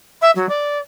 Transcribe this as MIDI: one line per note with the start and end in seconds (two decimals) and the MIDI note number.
0.21 0.31 76
0.35 0.46 54
0.49 0.78 74